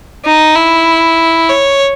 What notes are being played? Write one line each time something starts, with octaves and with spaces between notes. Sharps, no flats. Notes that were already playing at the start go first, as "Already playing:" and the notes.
D#4
E4
C#5